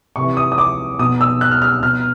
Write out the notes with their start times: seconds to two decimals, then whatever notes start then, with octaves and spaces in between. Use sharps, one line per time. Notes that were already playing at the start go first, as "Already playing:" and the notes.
0.16 C3 E3 C#6
0.37 D#6
0.52 D#6
0.58 D6
0.99 B2 D#6
1.21 E6
1.41 F#6
1.51 F6
1.62 F6
1.82 B2 F6